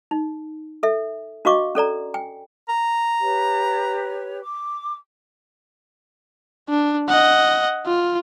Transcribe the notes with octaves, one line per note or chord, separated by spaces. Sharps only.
D#4
A4 E5
D4 F#4 D#5 F5 C#6 D6
C#4 A4 D5 A#5
G5 G#5
A#5
G4 B4 C#5
D6
D4
D#5 F#5
F4